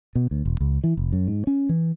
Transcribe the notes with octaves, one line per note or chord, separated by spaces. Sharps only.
B2
D2
E1
C#2
E3
F1
F#2
G#2
C#4
E3